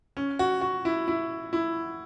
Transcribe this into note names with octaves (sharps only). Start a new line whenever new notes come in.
C#4
F#4
F#4
E4
E4
E4